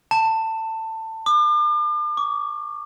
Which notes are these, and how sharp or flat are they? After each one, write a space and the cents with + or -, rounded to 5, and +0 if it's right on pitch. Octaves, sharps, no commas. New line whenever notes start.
A5 +20
D6 +40
D6 -40